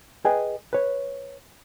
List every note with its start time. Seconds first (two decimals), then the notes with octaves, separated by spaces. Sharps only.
0.25 G#4 B4 D#5 G5 G#5
0.73 B4 C#5